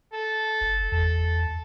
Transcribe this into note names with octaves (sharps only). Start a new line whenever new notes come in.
A4
F#1
E2 A4